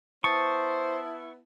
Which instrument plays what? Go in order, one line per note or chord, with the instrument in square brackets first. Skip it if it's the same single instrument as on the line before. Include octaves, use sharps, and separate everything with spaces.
[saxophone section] B3 E4 [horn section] C5 [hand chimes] A5 D#6 A6 [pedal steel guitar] C#6